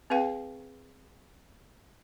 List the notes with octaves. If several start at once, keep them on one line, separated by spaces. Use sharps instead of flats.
C4 G#4 B4 F5 G5